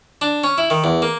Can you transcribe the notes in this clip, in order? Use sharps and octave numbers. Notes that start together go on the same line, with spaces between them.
D4
C#4
E4
D#3
E2
A#3